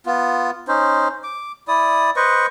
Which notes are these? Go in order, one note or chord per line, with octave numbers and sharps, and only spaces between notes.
B3 F4
C#4 D#4 C5
D6
E4 D5 D#6
B4 C5 D#5 C#6